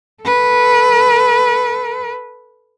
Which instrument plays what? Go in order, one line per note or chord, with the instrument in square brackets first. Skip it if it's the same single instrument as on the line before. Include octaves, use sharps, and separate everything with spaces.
[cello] A4 B4